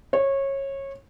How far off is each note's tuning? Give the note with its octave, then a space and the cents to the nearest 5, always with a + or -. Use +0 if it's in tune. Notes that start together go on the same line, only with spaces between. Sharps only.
C#5 -20